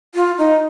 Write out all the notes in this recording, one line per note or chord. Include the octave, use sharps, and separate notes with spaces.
F4
D#4